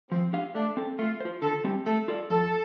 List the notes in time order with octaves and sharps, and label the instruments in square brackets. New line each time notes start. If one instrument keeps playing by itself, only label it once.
[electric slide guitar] F3 [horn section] C4
[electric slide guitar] D4 G4 F5
[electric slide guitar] A3 [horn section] D4
[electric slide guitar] C4 A4
[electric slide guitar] A3 [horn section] F4
[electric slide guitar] F4 C5
[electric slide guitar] D3 [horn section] A4
[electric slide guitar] G3 C4 G4
[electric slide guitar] A3 [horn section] A4
[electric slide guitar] F4 A4 D5
[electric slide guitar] F2 [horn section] A4